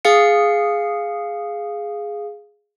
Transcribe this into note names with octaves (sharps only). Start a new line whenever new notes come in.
G#4 F5 C#7